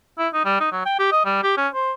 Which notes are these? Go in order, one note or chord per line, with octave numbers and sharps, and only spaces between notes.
E4
D#4
G3
D#4
F#3
G5
G4
D#5
G3
G4
C#4
C5